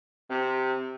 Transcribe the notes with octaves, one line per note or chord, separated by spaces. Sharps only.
C3